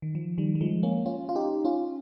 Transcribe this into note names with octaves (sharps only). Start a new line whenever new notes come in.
D#3
F3
D#3 G3
G3
F3 G#3
A#3 C#4
C#4 F4
F4
D#4 G4
C#4 F4